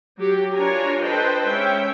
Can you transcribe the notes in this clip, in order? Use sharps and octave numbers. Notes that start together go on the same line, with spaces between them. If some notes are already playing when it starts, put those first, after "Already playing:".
F#3 G4
D4 F4 A#4 C#5 G#5 A#5
A4 B4 C5 D#5 G5
G#3 C#4 E5 G5